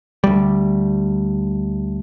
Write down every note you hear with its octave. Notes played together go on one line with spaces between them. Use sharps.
D2 G3